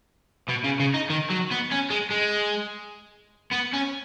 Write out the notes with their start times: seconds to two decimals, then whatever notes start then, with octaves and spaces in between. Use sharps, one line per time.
0.49 B2
0.64 C#3
0.80 C#3
0.94 D#4
1.10 D#3
1.30 F#3
1.51 B3
1.71 C#4
1.90 G#3
2.11 G#3
3.53 B3
3.74 C#4